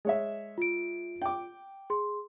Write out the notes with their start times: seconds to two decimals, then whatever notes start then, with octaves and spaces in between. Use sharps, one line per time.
0.05 G#3 C#5 E5
0.58 F4 D7
1.22 G5 D6
1.90 G#4 C6